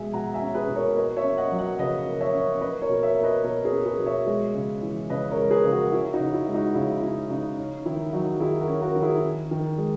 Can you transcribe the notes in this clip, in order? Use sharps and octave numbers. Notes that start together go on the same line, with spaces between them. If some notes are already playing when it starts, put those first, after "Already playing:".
Already playing: B2 G#3 E5 G#5
B2 F#5 A#5
E5 G#5
C#4
G#4 B4
B2
A#4 C#5
A#3 B4 D#5
C#5 E5
C#4
D#5 F#5
F#3
D#5 F#5
C#3 B4 D#5
A#3
C#5 E5
C#4
C#4 B4 D#5
A#4 C#5
B2
C#5 E5
A#3
B4 D#5
B2 A#4 C#5
G#4 B4
C#4
G#4 B4
B2
C#5 E5
G#3
C#3
E3
C#3 B4 D#5
A#4 C#5
G#3
G#4 B4
C#3
F#4 A#4
C#4 E4
D#4 F#4
C#3
E4
G#3
D#4 F#4
C#3 E4
C#4 E4
C#3 D#4
C#4 D#4
D#3 E4
F#3 D#4 F#4
D#3 E4 G#4
F#4 A#4
C#4
F#4 A#4
D#3
E4 G#4
C#4
D#3
G#3